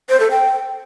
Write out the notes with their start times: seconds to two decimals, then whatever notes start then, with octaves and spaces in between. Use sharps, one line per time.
0.09 C5
0.20 A4
0.31 G5